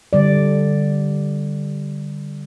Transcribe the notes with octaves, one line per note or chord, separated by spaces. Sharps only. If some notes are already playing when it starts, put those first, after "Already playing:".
D3 G3 D5